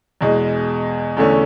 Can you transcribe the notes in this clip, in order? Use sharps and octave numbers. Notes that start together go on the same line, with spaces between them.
E2 B2 G#3
E2 D3 A3 C#4